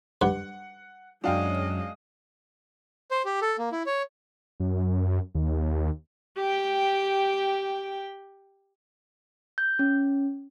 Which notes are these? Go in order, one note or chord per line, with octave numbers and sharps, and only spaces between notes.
G2 F#5
F#2 F#3 G#3 D4 D#5 F5 G5
C5
G4
A4
A#3
E4
C#5
F#2
D#2
G4 G5
G6
C#4